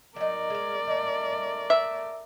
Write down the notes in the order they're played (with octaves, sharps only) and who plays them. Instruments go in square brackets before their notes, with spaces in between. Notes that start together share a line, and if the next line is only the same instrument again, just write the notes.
[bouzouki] F#3 D#4 [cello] A#4 D5
[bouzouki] G#3 F5
A3 D#4
[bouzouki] A3 [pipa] E5